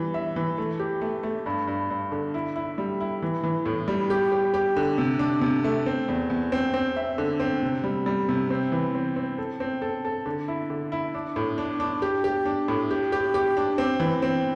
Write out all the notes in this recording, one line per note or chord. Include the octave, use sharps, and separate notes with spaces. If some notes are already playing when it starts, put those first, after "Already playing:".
Already playing: E3 G3
E5
E3
A3
G4
A3
A3
G2
G2
G2
D3
E4
E4
G3
E4
E3
E3
A2
G3
G4
G4
G4
D3
C3
D4
C3
A3
C4
E2
E2
C4
C4
E5
D3
C4
C3
G3
G3
C3
C4
E3
C4
C4
A4
C4
A4
A4
D3
E4
D3
E4
D4
A2
D4
D4
G4
G4
D4
A2
G4
G4
G4
D4
C4
E3
C4